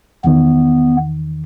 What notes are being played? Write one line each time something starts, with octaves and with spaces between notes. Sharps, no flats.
E2 D#3 B3